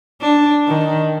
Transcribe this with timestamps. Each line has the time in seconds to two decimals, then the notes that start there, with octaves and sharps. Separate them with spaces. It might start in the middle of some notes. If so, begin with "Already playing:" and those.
0.21 D4
0.68 D#3